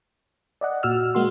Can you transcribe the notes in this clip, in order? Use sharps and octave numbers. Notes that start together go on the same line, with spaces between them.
D5 D#5 F#5
A#2 F#4 E6 F6
G#3 A#3 F#4 C6